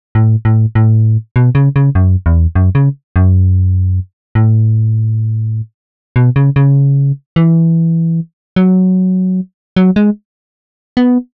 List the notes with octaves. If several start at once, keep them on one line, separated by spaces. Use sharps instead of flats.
A2
A2
A2
B2
C#3
C#3
F#2
E2
F#2
C#3
F#2
A2
B2
C#3
C#3
E3
F#3
F#3
G#3
B3